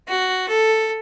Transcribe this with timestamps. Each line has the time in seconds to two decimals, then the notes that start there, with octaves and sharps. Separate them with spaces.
0.09 F#4
0.49 A4